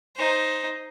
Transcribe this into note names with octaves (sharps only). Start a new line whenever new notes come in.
D#4 C5